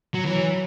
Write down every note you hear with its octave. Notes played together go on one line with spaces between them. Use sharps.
F#3
E3 F#3